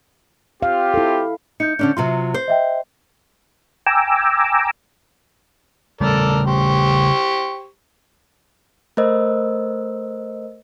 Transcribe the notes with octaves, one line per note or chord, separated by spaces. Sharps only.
C4 F4 G4 F5
E4 A4
D#4 G6 C#7
D3 C#4 D4
C3 F#3 F4 C6
C5
D#5 E5 G5
G5 G#5 A#5 D6 E6
C#3 G3 A3 A4 A#4 D5
G4 C5 C#6
A3 A#4 C5 D#5 E6